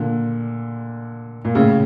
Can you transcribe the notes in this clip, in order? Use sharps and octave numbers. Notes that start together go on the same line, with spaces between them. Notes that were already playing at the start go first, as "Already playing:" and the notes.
Already playing: A#2 D3
A#2
A2 C#3